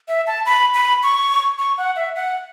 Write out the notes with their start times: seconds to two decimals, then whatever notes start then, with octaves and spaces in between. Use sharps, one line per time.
0.08 E5
0.27 A5
0.46 B5
0.74 B5
1.03 C#6
1.59 C#6
1.78 F#5
1.96 E5
2.16 F#5